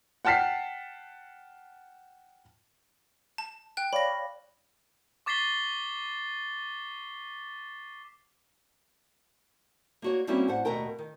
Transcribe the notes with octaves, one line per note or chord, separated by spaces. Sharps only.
F#5 G5 A5 F6 B6 C7
A5
G5 F#6
C#5 D5 F5 B5 A#6
C#6 D6 A6 B6 C7 G7
A#3 F#4 C#5
G3 A#3 C4 C#4 E4 F#4
A2 C5 F#5
D#2 B2 A3 A#4 G5
D#3